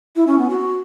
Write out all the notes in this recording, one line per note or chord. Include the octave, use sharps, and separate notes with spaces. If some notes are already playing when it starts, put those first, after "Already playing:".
E4
C#4
B3
F#4